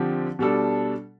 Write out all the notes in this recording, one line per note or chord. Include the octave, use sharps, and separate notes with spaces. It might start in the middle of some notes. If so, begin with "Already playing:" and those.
Already playing: D3 F3 C4 G4
B2 G3 D4 A4